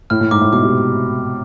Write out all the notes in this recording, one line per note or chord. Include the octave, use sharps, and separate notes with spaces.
A2 F6
A2
G#2 D6
A2
B2 D6
C3